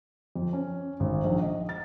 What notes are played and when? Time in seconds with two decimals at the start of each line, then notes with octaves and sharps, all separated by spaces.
0.35 F2
0.53 C#4
1.00 G#1
1.24 A#1
1.41 D#5
1.69 A6